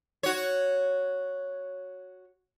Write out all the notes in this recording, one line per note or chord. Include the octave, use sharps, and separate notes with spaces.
F#4 C#5